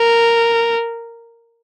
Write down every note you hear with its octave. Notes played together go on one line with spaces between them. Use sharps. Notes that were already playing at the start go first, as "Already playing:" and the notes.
Already playing: A#4